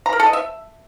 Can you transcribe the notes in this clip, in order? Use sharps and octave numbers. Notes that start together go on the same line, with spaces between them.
A#5
A#4
A4
D#5
E5